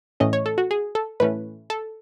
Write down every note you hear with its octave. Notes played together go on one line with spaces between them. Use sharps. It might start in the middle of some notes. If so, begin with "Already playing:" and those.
A2 E3 A3 C#4 D#5
C#5
A4
F#4
G#4
A4
A2 E3 A3 C#4 B4
A4